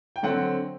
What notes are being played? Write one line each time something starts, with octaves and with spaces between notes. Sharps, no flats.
G5
D3 F#3 C4 F#5